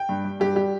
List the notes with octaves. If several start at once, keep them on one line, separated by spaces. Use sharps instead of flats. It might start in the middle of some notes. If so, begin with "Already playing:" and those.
Already playing: G5
G2
G3
G2 G4
G3 G4